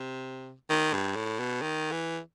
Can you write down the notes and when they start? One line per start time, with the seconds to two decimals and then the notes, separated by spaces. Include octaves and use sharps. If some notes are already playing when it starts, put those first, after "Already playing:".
Already playing: C3
0.70 D#3
0.94 G2
1.16 A2
1.39 B2
1.62 D#3
1.92 E3